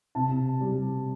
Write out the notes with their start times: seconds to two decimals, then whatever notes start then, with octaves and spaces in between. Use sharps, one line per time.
0.15 C3 A5
0.61 G3